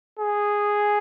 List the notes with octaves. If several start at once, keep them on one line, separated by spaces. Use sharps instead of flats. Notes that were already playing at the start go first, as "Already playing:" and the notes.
G#4